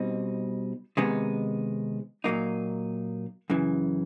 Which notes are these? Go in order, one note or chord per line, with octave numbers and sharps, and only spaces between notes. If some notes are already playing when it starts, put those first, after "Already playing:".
Already playing: B2 G3 C4 D#4
C3 D#3 G#3 B3 D#4
A#2 F#3 A#3 D#4
F#2 C#3 E3